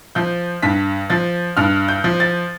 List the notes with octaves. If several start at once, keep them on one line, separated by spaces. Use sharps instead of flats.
F3 G6
G2 B6
F3 A6
G2 F6
G6
F3
A6